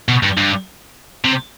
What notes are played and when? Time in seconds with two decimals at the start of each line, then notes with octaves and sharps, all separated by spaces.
0.08 B2
0.23 G2
0.37 G2
1.24 C3